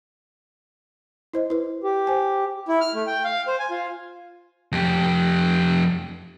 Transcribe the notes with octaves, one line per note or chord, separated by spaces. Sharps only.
E4 C5 D#5
E4 B4
G4
C5 G#5
E4
F6
A3
G5
F5
C5
G#5
F4
F2 G4